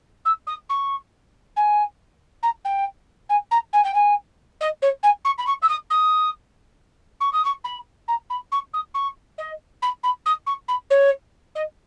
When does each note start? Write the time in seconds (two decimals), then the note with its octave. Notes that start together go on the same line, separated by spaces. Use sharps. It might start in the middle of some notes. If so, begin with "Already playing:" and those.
0.25 E6
0.46 D#6
0.69 C#6
1.56 G#5
2.42 A#5
2.64 G5
3.29 G#5
3.50 A#5
3.72 G#5
3.84 G5
3.94 G#5
4.60 D#5
4.81 C#5
5.02 G#5
5.24 C#6
5.38 B5
5.46 C#6
5.62 E6
5.68 D#6
5.90 D#6
7.20 C#6
7.32 D#6
7.44 C#6
7.64 B5
8.07 A#5
8.29 B5
8.51 C#6
8.73 D#6
8.94 C#6
9.38 D#5
9.82 B5
10.03 B5
10.25 D#6
10.46 C#6
10.68 B5
10.90 C#5
11.55 D#5